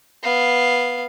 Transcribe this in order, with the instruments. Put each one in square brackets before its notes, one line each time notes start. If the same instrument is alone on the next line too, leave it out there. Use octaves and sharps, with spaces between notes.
[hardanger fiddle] B3 F5